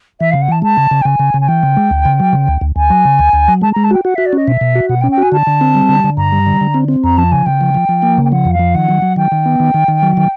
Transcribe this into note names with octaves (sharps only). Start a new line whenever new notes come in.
E3 E5
C#3 F5
F#5
E3 A5
G#3 A5
C#3
C#3
G5
C#3 G#5
C#3
C#3
G#5
E3 G5
C#3
G#3
D2
C#3
F#3
C#3
D2
D2
D2 G#5
F#3
C#3
D2
D2
F#3
G#3 A5
G#3 A#5
A5
F#4 G5
F#4 F#5
F#4 E5
D5
C#4 D#5
B2 E5
B2
F#4
B2 F#5
G5
C#4
G5
F#4 G#5
D3 A5
D3
C4
G3
D3
D3
G2 A#5
G3
D3
D3
C4
C4
F2 A#5
F3 A5
C#3 G#5
C#3 G5
F3
F3
F3
A#3
C#3
G5
F3 F#5
F2
F5
F3
D#3 F#5
F#3
F#3
D#3 G5
D#3
B3
D#3
D#3
D#3
F#3
D#3